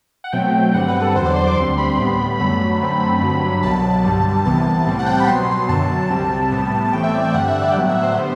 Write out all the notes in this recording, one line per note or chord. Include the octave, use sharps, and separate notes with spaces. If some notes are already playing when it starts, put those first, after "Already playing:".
F#5
B2 F#3 A3 C4 G5
G2 D3 G3 C4 F#5
B4
A4
E2 D3 F#3 C5
D5
C6
D6
D2 D3 G3 C4 C6
B5
A2 G3 B3
F#2 D3 F#3 A3 B5
F#2 D3 A3 C4
G2 D3 F#3
C2 B2 F#3 A5
G2 D3 G3
C2 C3 E3 B3 A5
A2 G3 C4
F#5
G5
A5
B5
B2 F#3 B3 C6
F#2 D3 F#3 A5
C2 C3 G3 C4
A2 G3 B3
A5
A2 E3 A3 C4 G5
E5
D5
E5
G2 D3 G3 F#5
E5
D5
G5
A2 F#3 B3 F#5
E5
C5
D3 G3 B3 C5